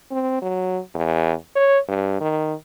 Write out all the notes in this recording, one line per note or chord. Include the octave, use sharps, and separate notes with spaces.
C4
F#3
E2
C#5
G2
D#3